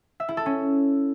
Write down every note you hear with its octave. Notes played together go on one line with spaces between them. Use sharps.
E5
E4
A4
C#4